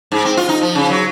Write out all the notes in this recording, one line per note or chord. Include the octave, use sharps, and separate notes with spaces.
G#2
C4
F4
D#4
F3
C#3
F#3